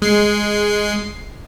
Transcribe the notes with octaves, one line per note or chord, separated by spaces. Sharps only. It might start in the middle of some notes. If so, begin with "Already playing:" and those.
G#3 C7